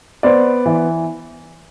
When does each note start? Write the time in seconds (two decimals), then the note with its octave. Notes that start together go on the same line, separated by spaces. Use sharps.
0.23 B3 C5 D5
0.66 E3